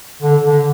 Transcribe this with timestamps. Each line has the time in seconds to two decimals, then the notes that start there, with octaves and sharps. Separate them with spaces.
0.22 D3
0.44 D3